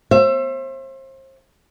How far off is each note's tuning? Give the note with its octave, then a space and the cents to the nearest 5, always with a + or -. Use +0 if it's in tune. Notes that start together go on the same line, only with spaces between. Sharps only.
C5 +35 E5 +30